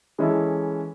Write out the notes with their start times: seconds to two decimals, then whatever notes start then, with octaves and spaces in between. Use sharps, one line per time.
0.18 E3 G#3 C#4 E4 A4